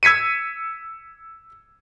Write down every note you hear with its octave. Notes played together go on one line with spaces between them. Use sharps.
E6 G#6 B6 C#7 D#7